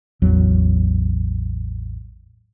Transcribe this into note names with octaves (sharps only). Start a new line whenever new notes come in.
A1 E2 F#3